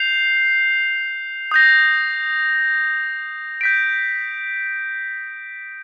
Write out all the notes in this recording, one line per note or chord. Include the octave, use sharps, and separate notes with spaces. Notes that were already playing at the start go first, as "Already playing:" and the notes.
Already playing: G6 C7 F7
D#6 G6 A#6
G6 B6 D7